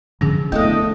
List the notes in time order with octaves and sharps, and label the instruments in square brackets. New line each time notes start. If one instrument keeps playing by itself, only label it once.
[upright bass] D3 F3 [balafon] C#4 G#4
[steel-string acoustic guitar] A2 D4 A4 [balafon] A3 B3 [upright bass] E4 [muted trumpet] D#5